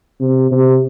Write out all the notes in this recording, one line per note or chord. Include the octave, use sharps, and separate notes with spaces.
C3
C3